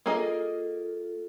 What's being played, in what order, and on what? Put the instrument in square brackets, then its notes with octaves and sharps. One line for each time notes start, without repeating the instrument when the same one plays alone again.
[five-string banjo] A#3 G#4 D#5 [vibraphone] F4 A4